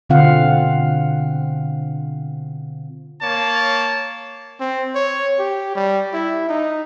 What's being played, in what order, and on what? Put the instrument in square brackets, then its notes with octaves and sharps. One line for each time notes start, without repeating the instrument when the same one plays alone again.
[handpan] B2 D3 C4 F4 F5 F#5
[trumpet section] A#3 C#5 A5
[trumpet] C4
C#5
G4
G3
E4
D#4